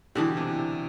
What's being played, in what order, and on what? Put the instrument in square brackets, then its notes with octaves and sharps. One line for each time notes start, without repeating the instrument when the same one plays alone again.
[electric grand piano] B2 D3 [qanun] E3 G3 D4 G4
[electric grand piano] C3
C3